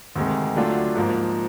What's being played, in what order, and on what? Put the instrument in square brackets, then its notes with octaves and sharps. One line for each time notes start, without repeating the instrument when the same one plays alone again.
[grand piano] D2 C3 D#3 G#3
D3 F#3 A3 D4 F4
G#2 F3 A#3